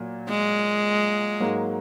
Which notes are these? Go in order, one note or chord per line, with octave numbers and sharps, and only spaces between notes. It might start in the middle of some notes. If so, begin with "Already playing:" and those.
Already playing: A#2 F#3 A#3
G#3
G#2 F#3 A#3